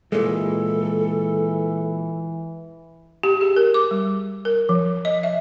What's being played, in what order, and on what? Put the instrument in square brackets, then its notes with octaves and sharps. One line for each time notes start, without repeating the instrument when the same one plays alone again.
[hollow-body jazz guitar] A#2 G#3 [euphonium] E3 [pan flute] A4
[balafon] G4
G#4
A#4
D6
G3
A#4
F3
D#5
E5